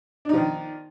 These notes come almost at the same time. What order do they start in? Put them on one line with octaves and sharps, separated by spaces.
D4 D#4 F3 D#3